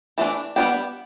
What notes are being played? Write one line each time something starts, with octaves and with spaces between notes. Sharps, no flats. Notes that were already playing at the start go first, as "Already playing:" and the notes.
E3 A3 D4
G3 B3 D4 G5